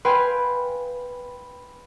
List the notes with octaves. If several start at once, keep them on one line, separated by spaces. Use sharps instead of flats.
B4 F5 G5 G#5 B5 C6